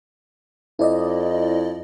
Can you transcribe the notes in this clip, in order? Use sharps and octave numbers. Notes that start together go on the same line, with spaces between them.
F2 E4 D5 D#5